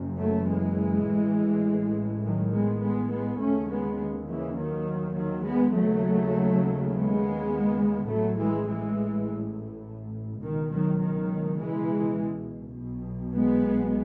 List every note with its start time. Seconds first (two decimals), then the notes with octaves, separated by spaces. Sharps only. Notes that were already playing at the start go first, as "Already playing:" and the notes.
Already playing: F#1 F#2
0.19 F#3 A3
0.48 E3 G#3
1.07 A1 A2
2.24 D#3 F#3
2.53 G#3 B3
2.82 G#3 B3
3.11 G#3 B3
3.40 D#2 C#3 A3 C#4
3.70 G#3 B3
4.29 C#3 E3
4.57 D#3 F#3
5.16 D#3 F#3
5.45 G#3 B3
5.74 D#2 C#3 F#3 A3
6.91 G#3 B3
8.08 A1 A2 F#3 A3
8.38 E3 G#3
8.67 E3 G#3
10.42 C#2 B2 D#3
10.71 D#3 F#3
11.01 D#3 F#3
11.59 E3 G#3
12.76 B1 B2
13.34 G#3 B3